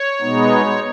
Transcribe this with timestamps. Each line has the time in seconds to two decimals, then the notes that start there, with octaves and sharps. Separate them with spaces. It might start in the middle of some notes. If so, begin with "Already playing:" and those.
Already playing: C#5
0.21 B2 G#3 B3 D#4